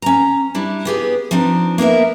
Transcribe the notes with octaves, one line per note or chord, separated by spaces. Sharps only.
C#4 A#5
G3 D4 E4
B3 G4 G#4
F3 C4 D4 D#4
A#3 B3 A#4 E5